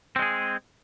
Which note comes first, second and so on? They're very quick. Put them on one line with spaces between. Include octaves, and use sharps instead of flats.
C4 G#3 G#4